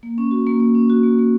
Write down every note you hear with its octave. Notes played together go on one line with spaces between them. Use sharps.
A#3
C#4
F#4
A#3
A#3
C#4
F#4
A#3
A#3